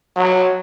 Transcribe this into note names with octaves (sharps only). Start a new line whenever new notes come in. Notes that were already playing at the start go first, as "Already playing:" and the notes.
F#3